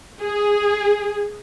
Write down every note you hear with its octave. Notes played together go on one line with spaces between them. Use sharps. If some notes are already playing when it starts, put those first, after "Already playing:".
G#4